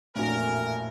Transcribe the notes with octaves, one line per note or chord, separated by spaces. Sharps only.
A1 F2 A#2 A3 D4 F#4 A#4 G#5